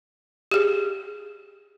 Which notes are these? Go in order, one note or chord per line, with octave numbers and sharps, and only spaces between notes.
G4 G#4